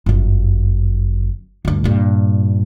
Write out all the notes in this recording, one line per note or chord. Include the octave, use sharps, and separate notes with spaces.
G1 F#2
D2 G2
G2 A#2